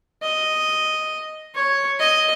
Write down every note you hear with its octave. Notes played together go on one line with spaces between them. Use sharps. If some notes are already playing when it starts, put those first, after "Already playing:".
D#5
C#5
D#5